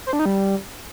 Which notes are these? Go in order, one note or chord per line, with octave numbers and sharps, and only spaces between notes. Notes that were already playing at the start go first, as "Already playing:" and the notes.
C5
D4
D#4
G3